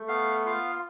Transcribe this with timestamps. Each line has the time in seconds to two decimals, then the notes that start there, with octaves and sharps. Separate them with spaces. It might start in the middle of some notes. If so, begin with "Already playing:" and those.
Already playing: A3
0.08 B3 F5
0.46 F4 F5